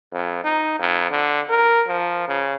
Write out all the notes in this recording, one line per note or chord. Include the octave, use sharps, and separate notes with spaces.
F2
D#4
F2
D3
A#4
F3
C#3